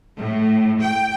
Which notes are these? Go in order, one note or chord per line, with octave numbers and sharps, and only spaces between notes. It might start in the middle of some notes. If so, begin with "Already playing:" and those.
A2
G5